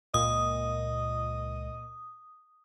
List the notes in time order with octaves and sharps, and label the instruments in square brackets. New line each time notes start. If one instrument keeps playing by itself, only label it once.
[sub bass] C#2 [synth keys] A#2 [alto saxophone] D#5 [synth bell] D#6